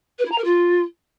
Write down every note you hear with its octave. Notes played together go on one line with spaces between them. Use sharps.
B4
E4
A#5
A#4
F4